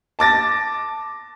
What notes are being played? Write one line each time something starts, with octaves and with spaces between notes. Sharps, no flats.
A5 D6 A6 A#6